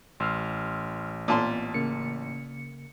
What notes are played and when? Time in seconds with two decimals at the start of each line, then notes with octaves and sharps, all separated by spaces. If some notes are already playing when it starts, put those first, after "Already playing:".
0.20 A1 C6 E6 F6
1.28 A#2 B3 A5 C6
1.74 C#3 A#3 C#7